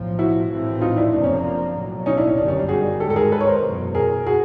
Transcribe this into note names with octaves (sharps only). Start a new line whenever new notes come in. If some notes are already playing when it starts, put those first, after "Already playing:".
Already playing: B1 A2 F3
E4 F#4
A#1 A2 E3 A3 C4
D#4 F4
D4 E4
F#1 F2 C3 F3 A#3 D4
C#4
D4
B1 A2 F#3
C#4 D#4
D4 E4
C#4
G1 F#2 D#3 G3 D4
C#4
D4
F#4 G#4
G#2 D#3 G#3 G4 A4
A4
G#4 A#4
A4 B4
C#5
A#4 C5
F#1 E2 B2 F#3
G#4 A#4
F#4 G#4